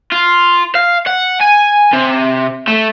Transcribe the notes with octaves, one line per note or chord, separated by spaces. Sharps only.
F4
F5
F#5
G#5
C3
A3